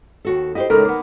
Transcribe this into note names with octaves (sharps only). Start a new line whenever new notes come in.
D#2 F#4 A4
E4 G4 C5 D#5
C#2 A2 A3 D#4 A#4
A#3 B3